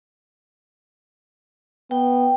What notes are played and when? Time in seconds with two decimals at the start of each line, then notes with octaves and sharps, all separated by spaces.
1.91 B3 G5